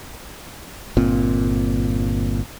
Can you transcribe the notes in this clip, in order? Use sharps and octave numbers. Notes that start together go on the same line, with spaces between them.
G1 A#2 C4